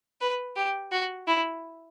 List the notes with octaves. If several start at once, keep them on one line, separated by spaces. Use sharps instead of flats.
B4
G4
F#4
E4